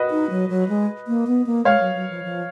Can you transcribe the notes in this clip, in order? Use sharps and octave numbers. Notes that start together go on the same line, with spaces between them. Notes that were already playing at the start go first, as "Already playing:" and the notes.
Already playing: F#4 B4 D#5
D#4
F#3
F#3
G#3
A#3
B3
A#3
G#3 C#5 F5
F#3
F#3
F3
F3